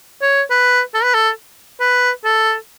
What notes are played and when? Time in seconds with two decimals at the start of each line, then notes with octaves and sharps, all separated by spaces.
0.22 C#5
0.50 B4
0.94 A4
1.04 B4
1.14 A4
1.80 B4
2.24 A4